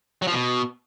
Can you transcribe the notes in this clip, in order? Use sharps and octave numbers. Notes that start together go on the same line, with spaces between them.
F#3
F3
B2